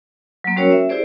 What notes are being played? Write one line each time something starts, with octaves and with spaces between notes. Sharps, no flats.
F#3 A#3
G3 C#4 F#4 A#4 C#5 E6
E5
E4 G4 G#4 C5 D5